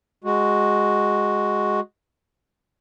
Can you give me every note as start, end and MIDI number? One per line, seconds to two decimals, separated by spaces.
0.24 1.80 56
0.24 1.80 66